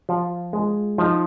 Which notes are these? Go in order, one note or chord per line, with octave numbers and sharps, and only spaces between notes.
F3 F4
G#3
F3 D#4